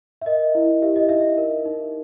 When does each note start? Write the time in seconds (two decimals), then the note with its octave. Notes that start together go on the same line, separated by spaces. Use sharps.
0.22 E5
0.26 A#4 D#5
0.55 E4
0.82 G4 E5
0.96 D#5
1.09 D#4 E5
1.38 A#4
1.66 D#4